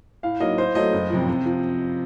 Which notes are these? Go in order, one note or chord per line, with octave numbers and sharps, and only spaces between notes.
A2 F5
F#3 A#3 D#4 D#5
A2 C5
F#3 A3 D#5
F#1
F2 C3 F3
C3
F3